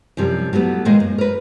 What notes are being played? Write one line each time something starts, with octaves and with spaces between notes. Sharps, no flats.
F#2 C3 F3 G3
F#3 G3 A3 B3
A#2 D#3 G#3 A#3 D#5
F#2
A#4 B4